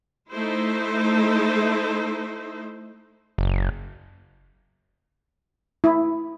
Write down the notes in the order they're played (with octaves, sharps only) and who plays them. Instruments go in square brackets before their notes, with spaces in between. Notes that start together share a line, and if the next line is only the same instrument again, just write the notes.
[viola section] A3 D#4 E4 C5
[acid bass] F#1
[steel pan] E4